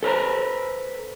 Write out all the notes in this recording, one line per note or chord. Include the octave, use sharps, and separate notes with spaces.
A4 B4 C5 A#5